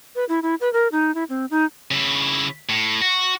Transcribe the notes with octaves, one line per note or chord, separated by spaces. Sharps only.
B4
E4
E4
B4
A#4
D#4
E4
C4
D#4
C#3 E4
A2
F#4